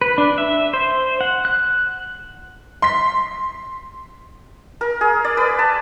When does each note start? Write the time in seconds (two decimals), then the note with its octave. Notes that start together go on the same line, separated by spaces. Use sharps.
0.01 B4
0.18 D4
0.38 E5
0.73 C5
1.21 F#5
1.45 F#6
2.82 C6 B6
4.81 A#4
5.01 G#4
5.24 D5
5.37 B4
5.59 A5